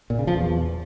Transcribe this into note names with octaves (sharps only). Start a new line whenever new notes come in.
A#2
C#3
F3
E2